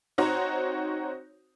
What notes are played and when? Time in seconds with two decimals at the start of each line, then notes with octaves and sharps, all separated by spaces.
0.18 C4 D#4 F#4 C5 C#5